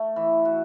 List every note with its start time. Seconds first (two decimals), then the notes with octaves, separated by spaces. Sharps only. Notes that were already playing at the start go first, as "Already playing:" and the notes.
Already playing: A3
0.16 E3
0.45 F#4